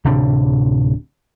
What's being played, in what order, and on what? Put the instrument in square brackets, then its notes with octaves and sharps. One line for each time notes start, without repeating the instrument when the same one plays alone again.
[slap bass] D1 C3 D4